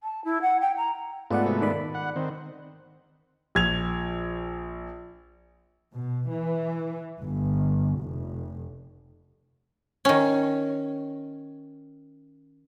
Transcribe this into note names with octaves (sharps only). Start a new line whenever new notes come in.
A5
E4
F#5
G5
A#5
G#2 A3 B3 F4 D5 F#5
C3 C4 F#4
D#3 D5 B5
F#5
D#3 C4
A#1 G#6 F7
B2
E3
G1
F1
D#3 C#4